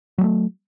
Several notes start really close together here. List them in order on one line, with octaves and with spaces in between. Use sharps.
F#3 G#3 A3